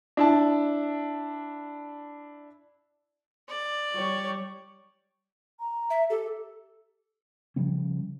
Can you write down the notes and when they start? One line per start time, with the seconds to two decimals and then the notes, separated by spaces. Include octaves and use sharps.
0.17 D4 E4 A5
3.49 D5
3.96 G3 C#5
5.60 A#5
5.90 E5
6.10 G4 A4
7.56 C#3 F3 G3 C#4